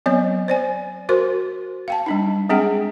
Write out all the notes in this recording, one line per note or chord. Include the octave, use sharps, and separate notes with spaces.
F#3 B3 C4 C#5 D#5
C5 D5 G#5
F#4 A#4 C5 C6
F5 G5 A5
G3 D4 D#4
G#3 C4 D4 G#4 F#5 G5